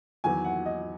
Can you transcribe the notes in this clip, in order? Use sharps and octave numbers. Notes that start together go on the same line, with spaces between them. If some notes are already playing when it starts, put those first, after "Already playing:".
E2 D#3 F#3 G#5
F#5
D#5